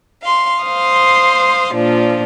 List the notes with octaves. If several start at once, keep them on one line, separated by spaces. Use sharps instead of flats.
F5 C6
C5 F5 C6 D#6
A#2 F3 D4 F4